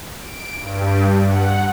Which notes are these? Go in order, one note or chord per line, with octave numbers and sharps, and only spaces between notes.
D7
G2
F#5